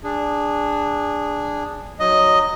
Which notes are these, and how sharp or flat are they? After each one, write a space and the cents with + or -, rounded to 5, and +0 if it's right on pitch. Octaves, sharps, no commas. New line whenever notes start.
D4 +0 G#4 -15
F#3 +0 D#4 -20 D#5 +0